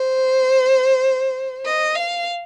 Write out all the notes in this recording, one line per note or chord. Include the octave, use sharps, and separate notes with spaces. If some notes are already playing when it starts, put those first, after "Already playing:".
Already playing: C5
D#5
F5